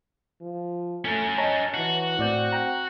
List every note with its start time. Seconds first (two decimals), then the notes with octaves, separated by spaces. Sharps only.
0.41 F3
1.05 A3 C#4 A#4
1.38 C#5 D#5 A5 A#5
1.74 E3 F#4
2.19 A2 C4 D5 G6
2.52 F#5 G5 A#5